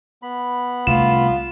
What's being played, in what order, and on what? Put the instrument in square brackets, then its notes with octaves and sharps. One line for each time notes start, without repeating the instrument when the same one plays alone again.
[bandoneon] B3 B5
[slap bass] C2 A3 [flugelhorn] F4 [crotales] E7